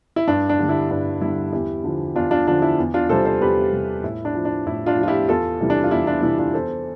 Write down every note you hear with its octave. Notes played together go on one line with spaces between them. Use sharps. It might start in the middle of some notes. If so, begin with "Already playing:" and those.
E4
G2 D4
D4
D3 G3
E4
G2 D4
D3 G3 E4
E2 E4 G4
D3 F3
E2 D4 F4
D4 F4
D3 F3 D4
E4
E2
D4 F4
C3 G3 A4 C5
A4 C5
E2 G4 B4
C3 G3
A2 E4
D4
F3
D4
A2 E4
D4 F4
F3
F4
E4 G4
E2 F4 A4
C3 E3 G3
D4
F4
E2 E4
D4 F4
C3 E3 G3 E4
D4 F4
E2 A4 C5